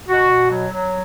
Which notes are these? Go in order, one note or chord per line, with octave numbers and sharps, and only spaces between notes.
B2 F#4
B2
F#3
F#3